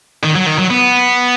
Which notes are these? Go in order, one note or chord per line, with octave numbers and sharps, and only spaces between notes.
D#3
F#3
D#3
F#3
B3